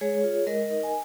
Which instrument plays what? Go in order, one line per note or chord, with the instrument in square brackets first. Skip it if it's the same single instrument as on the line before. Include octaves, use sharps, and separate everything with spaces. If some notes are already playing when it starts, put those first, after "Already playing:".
[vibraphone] G#3 G#4 C#5
F4
G#3 A#4 D#5
D#4
G#5